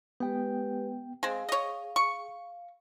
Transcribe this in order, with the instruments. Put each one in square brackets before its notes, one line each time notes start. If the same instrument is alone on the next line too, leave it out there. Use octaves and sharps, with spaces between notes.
[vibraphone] G#3 G4 B4 [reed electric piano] B3 G5
[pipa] G#3 C4 [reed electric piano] G#4 [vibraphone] F5
[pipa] C#5 D#5
C#6